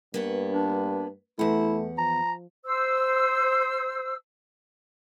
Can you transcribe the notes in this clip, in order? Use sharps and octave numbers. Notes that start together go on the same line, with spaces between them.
G2 A#3 B3 C#5
D4
E2 A3 E4 F#5
F3 A#5
C5 E6